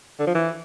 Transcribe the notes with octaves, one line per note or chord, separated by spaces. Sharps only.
D3
F3
E3